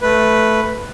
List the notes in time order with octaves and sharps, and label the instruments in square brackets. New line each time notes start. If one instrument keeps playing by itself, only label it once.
[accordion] A3 B4